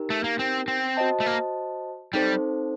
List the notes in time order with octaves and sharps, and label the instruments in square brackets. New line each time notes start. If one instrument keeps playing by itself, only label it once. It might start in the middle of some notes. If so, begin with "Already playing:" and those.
Already playing: [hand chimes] D#4 G4 A#4
[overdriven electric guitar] A3
A#3
C4
C4
[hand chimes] F#4 C5 D#5 A5
[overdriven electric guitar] A3
A#3
[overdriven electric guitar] G3 [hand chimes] C4 D#4 A4 C5